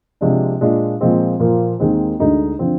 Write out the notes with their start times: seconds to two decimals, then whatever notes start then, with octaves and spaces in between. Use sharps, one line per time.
0.21 C3 F3 G#3 D4
0.61 A#2 G#3 D4 F4
1.01 A#2 F3 G#3 C4
1.40 A#2 F3 A#3
1.80 D#2 D#3 G#3 C4
2.19 D2 D3 G#3 D#4
2.59 D3 F3 C4